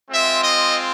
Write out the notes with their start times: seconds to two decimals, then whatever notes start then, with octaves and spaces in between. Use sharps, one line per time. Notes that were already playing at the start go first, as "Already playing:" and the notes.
0.10 G#3 C4 F4 E5
0.42 D#5